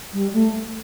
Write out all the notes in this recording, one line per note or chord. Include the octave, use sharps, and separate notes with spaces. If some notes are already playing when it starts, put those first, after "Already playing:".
G3
A3